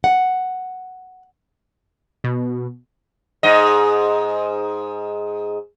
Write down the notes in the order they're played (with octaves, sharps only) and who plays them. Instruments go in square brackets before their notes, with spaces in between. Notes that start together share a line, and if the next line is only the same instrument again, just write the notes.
[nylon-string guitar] F#5
[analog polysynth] B2
[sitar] G#2 D#5